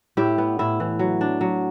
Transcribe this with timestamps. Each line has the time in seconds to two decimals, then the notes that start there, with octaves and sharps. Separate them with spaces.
0.17 A2 E4 G4
0.38 B3
0.59 A2 E4
0.80 E3
0.99 F#3
1.21 D4
1.41 F#3